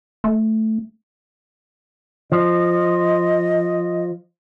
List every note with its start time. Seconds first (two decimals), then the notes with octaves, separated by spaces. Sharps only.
0.24 A3
2.32 F3 D#5